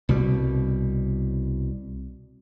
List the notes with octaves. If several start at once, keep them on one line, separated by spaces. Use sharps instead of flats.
C2 B2 G3